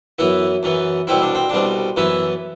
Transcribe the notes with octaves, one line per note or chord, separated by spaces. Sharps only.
F#2 E3 B3 E4
F#2 E3 B3
C2 B2 G3 C4 E4
D4
C4
C2 B2 G3 C4 D4
F#2 E3 B3 E4